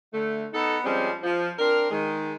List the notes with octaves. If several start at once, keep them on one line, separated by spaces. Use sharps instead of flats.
D3 A3
B3 D#4 A4
F3 G3 G#3 C4 C#4
F3
C4 D4 A#4
D#3 G#3